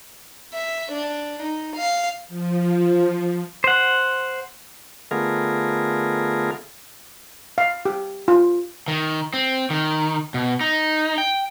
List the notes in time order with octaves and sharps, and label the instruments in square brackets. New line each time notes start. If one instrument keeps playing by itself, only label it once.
[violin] E5
D4
D#4
F5
[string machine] F3
[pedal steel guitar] C5 F#5
[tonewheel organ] D3 A3 B3 F4 G#4 A#4
[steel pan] F5
G4
F4
[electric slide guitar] D#3
C4
D#3
B2
D#4
G5